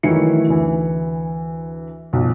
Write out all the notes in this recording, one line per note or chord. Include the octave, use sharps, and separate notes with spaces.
D#3 E3 F#3 A3 E4 C#7
D2 E3
B1 F3